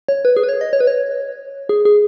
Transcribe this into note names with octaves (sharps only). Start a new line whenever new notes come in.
C#5
B4
G#4
B4
C#5
D#5
C#5
B4
C#5
G#4
G#4